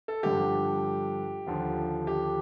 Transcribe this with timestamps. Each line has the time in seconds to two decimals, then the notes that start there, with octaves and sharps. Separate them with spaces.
0.08 A4
0.23 G2 D3 F3 G4
1.46 D#2 D3 F3
2.07 G4